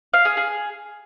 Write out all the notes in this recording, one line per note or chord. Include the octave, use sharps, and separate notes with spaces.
F5
G#4
G#4